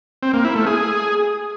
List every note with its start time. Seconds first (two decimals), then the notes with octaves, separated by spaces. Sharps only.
0.23 C4
0.34 A#3
0.45 E4
0.55 A3
0.66 G#4